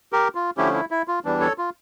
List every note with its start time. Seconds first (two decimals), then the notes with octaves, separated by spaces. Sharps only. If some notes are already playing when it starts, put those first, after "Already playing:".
0.13 G4 A#4
0.35 F4
0.57 D3 F3 A3 C#4 E4 G4
0.74 E4
0.91 E4
1.08 F4
1.25 E2 E3 G3 D4
1.41 A4 C#5
1.58 F4